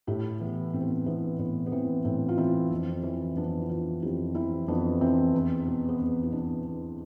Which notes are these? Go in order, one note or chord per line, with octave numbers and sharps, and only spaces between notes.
A2 E4 G4
E3 B3
A2 C4
B3
C4
E3 B3 D4
A2 B3
B3
E3 C4
A2 C4
F4
E3 C4 E4
F2 C4
E3
F2 B3 D4
E4
E3 D4 F4
F2 E4 G4
E3 C4 E4
F2 B3 D4
E3 C4
E2
B2
B3
E2 C4
E4
B2 B3 D4
E2